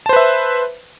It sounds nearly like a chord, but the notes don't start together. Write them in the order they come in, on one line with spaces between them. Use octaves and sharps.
A5 C5 B4 E5